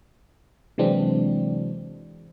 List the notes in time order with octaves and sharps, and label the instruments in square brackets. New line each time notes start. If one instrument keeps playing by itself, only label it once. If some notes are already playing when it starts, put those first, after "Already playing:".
[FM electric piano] C3 E3 F#3 G#3 C4 D4